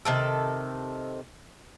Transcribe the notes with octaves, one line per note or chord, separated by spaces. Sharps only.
C3 D#3 A4